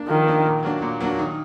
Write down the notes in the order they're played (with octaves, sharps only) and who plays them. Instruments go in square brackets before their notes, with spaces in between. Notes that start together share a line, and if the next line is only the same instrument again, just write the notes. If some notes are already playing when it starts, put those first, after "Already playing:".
Already playing: [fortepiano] A#3 D4
[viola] D#3 [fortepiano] F3
[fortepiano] A#3 D4
A#2
F#3 A#3 D4
A#2
F#3 A#3 D4
D#3